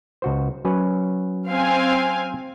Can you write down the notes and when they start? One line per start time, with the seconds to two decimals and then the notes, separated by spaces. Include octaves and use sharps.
0.22 C#2 F#4 C5
0.65 F#3 C#4 B4
1.48 C4 F5 G#5